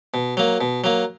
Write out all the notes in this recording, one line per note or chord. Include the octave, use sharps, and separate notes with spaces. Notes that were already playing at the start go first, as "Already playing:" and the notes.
B2
F#3 A#3
B2
F#3 A#3